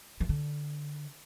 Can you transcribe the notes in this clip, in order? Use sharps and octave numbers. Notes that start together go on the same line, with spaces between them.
E3
D3